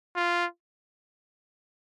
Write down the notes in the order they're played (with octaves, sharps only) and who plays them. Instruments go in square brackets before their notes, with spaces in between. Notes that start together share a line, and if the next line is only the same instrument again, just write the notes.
[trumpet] F4